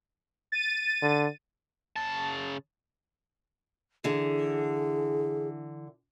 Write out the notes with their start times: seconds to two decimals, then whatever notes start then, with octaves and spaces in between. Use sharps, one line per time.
0.52 A6 D#7
1.02 D3
1.96 C#3 A5
4.04 D3 E3 G#4